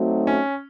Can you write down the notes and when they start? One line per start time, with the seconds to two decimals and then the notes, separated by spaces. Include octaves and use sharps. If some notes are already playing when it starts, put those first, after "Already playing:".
Already playing: F#3 A3 C4 D#4 F#4
0.27 C#4